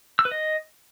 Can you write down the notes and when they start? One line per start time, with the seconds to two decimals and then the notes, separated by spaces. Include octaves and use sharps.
0.19 E6
0.25 B4
0.31 D#5